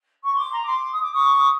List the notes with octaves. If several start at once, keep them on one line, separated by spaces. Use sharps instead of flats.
C#6
C6 D6
A#5 C6
C6 D6
D#6
D6
C#6 D#6
D#6